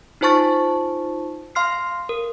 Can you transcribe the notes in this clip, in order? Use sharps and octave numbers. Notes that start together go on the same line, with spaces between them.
D#4 F4 C5 A5 C#6 A6
F5 C6 F6 C7
A#4